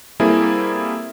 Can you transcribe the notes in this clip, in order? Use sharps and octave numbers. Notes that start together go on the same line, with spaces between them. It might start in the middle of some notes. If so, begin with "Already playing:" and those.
G3 A#3 C4 E4 G#4 A4